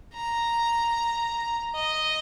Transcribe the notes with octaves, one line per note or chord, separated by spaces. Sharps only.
A#5
D#5